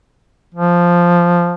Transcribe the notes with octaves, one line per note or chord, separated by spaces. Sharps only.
F3